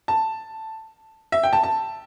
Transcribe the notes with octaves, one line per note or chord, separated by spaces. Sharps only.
A5
E5
G5
A5
A5